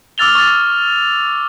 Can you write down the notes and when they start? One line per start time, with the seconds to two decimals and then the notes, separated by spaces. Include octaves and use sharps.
0.18 D6 E6 F6 A6 F7 G7
0.35 C#6 A6